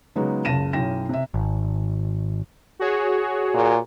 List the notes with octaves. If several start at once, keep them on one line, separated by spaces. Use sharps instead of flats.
C#3 F#3 G#3 B3 D#4 F#4
F#1 C#2 A5 A#6 D#7 E7
B1 F#2 E4 G5 A#6 E7
C3 E5
G#1
F#4 G#4 C#5
A#2